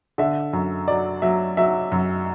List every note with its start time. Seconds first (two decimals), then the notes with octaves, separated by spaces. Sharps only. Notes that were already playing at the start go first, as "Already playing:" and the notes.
0.18 D3 E5
0.53 F#2
0.88 F#3 D5
1.22 F#3 E5
1.57 F#3 E5
1.92 F#2